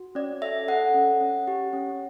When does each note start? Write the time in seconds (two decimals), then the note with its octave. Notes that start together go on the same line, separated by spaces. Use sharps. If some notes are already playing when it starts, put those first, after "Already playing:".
Already playing: F#4
0.15 C#4 D5
0.42 A4 E5
0.68 A4 F#5
0.94 C#4
1.21 C#4
1.48 G4
1.73 C#4